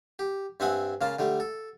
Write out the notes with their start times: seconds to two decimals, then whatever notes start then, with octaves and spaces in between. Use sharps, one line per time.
0.19 G4
0.60 G2 C4 E5 F#5 G#5 D#6
1.01 C#3 A#3 F4 A5
1.19 D3 G3 A3
1.40 A4